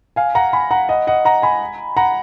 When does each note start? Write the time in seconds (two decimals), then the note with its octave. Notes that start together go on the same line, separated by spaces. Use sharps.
0.16 F5 G#5
0.35 F#5 A#5
0.53 G#5 B5
0.71 F#5 A#5
0.89 D#5 F#5
1.07 D#5 F#5
1.25 F#5 A#5
1.42 G#5 B5
1.97 F#5 A#5